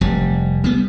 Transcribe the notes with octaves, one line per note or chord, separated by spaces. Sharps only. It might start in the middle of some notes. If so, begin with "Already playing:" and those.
F1 G3
G3 B3